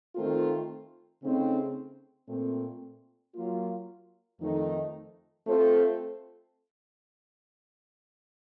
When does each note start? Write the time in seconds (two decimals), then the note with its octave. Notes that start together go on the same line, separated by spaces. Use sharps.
0.15 D#3 A3 C4 F4 A#4
1.21 C#3 A3 C4 D#4
2.27 A#2 A3 C4
3.34 F#3 A#3 F4
4.39 F2 D#3 A3 D#4
5.46 A3 C4 F4 A4 C5